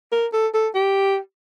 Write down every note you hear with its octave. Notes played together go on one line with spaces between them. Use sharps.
A#4
A4
A4
G4